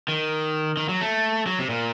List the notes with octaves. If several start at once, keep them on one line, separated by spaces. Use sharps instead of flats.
D#3
D#3
F#3
A3
F#3
C3
A#2